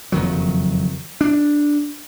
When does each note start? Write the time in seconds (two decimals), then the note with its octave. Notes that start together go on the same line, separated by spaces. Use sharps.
0.12 F#1 F2 D#3 F#3
1.21 D4